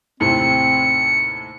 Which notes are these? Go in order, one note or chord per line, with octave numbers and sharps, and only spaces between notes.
D#2 A2 C3 C4 C#7